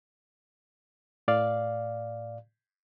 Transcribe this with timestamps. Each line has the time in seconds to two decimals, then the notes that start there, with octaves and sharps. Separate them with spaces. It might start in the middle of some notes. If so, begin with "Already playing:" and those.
1.28 A2 D5 F5